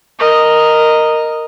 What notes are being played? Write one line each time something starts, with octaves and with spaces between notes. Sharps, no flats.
A#4 D#5